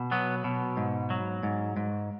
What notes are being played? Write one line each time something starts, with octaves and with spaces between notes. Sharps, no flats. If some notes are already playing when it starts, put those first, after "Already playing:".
Already playing: B2
F#3 B3
B2
G#2
F#3
G#2
G#2